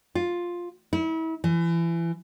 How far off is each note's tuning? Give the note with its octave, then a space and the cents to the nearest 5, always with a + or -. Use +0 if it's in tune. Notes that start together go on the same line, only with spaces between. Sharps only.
F4 +5
E4 -35
E3 +30